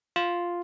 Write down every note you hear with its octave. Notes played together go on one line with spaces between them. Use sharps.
F4